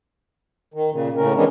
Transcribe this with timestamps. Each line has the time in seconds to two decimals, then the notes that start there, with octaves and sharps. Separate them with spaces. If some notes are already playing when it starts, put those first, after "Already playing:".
0.74 D#3
0.92 A#2 C#3
1.17 A2 C#3 C#4 A#4
1.36 D#3 E3 G#3 B3 C#4 D4